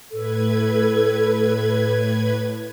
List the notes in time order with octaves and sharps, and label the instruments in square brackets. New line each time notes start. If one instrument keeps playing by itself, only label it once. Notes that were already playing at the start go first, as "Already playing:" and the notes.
[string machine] A2 B4 G#6 [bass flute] A4